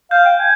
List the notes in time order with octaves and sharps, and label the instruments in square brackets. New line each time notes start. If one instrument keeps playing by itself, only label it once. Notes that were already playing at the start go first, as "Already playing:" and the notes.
[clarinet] F5 [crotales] G6
[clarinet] G5
G#5